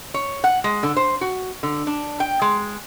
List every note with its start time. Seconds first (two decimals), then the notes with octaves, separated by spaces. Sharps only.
0.14 C#5
0.44 F#5
0.64 G#3
0.83 D3
0.96 C5
1.21 F#4
1.63 D3
1.87 D4
2.20 G5
2.42 G#3